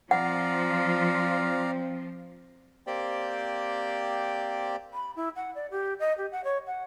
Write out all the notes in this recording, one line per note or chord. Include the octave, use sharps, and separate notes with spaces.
F3 C4 D5 F5 F#5 A#5
A#3 C4 G4 C5 D5 G5
B5
E4
F#5
D5
G4
D#5
G4
F#5
C#5
F#5